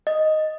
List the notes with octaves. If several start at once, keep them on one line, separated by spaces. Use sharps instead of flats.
D#5